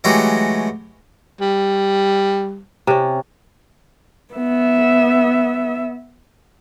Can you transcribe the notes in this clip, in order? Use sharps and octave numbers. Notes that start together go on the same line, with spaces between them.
E3 F#3 G#3 A3 F#4 G4
G3
C3 C#4
B3 E5